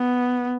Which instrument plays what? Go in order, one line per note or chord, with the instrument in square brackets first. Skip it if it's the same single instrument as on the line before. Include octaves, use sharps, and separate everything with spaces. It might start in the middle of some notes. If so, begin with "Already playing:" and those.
Already playing: [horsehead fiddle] B3